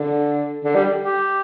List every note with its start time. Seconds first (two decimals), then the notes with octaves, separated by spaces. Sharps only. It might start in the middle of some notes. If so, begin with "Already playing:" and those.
Already playing: D3
0.64 D3
0.75 G3
1.00 G4